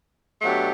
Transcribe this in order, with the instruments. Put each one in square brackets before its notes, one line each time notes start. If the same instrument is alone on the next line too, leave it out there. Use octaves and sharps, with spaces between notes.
[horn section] B2 F#3 A3 D4 G4